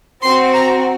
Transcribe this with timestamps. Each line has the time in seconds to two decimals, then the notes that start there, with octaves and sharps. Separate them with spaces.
0.23 C4 F#4 C6
0.54 A#5